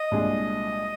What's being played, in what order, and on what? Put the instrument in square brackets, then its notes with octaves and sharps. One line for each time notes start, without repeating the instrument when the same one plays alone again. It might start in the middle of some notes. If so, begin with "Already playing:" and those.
Already playing: [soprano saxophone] D#5
[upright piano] C2 A#2 G#3 D4 G#4